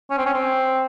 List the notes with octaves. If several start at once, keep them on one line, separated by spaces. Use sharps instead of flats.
C#4
C4
C#4
C4